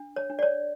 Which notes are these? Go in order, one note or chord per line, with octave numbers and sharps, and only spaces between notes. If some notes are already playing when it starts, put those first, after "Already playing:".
Already playing: D4
C#5
D4
D5
C#5